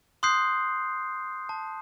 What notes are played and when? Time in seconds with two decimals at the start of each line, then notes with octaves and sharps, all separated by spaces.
0.23 C6 D#6 F#6 G6 C7
1.49 A5